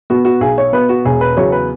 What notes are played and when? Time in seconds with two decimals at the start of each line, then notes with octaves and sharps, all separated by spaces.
0.10 B2 B3 F#4
0.25 F#4
0.41 B1 G#4
0.58 C#5
0.73 B2 B3 B4
0.89 F#4
1.05 E1 G#4
1.21 B4
1.37 E2 C#3 F#3 B3 C#5
1.52 B4